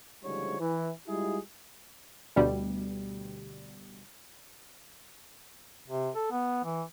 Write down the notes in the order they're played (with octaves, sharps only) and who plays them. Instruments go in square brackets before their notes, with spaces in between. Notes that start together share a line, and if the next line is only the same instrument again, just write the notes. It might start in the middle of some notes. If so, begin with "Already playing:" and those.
[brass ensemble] D2 G#2 C#3 F3 G3 C#5
E3
G3 G#3 E4 F4 G4 G#4
[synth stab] D2 B2 G3
[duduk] C3
A4
B3
E3